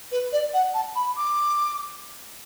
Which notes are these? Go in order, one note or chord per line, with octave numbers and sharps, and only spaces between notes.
B4
D5
F#5
A5
B5
D6